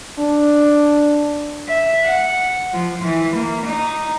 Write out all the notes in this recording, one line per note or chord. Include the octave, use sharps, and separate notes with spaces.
D4
E5
F#5
F3
E3
A#3
D#4